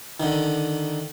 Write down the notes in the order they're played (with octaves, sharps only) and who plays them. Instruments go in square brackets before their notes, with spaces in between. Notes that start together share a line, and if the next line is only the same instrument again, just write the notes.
[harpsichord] D3 D#3